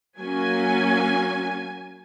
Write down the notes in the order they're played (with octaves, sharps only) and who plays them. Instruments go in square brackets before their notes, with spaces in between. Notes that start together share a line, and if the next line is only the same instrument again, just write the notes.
[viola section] F#3 A#3 C#4 G#5